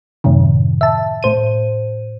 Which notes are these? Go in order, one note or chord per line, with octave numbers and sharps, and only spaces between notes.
F#2 A2 C3 D#3
E5 A5
A2 C5 D#7